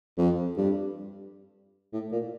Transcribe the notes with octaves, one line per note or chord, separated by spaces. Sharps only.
F2
G2
A2
A#2